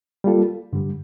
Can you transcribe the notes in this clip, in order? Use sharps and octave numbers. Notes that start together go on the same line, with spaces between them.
G3 A#3 F4 A4
G2 D3 G3